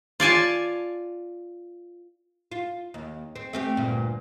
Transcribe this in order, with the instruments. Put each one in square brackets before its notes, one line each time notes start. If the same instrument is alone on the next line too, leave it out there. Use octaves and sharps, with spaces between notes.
[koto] F4 D5 G#5 A5
[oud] F4
D#2
C4
A3 C4 G4
D2 G2 A#2